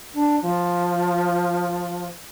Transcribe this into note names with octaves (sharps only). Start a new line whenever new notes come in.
D4
F3